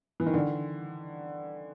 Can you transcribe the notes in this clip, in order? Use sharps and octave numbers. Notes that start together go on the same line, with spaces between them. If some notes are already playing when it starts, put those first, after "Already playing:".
E3
D#3
D3